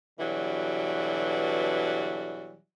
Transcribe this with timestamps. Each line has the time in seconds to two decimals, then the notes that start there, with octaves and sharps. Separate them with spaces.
0.20 B2 D3 E3 F#3 G3